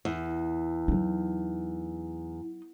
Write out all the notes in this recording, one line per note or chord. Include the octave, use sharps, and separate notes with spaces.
E2
F#3 D#4